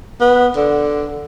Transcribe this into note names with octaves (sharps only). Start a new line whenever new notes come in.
B3
D3